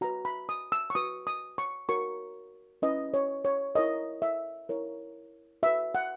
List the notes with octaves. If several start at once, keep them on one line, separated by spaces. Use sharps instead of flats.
F#4 B4 A#5
B5
D#6
E6
C#6
F#4 B4 D#6
D#6
C#6
F#4 A#4 C#5 C#6
C#4 E4 B4 D#5
C#5
C#5
E4 A#4 C#5 D#5
E5
E4 A#4 C#5
F#4 B4 E5
F#5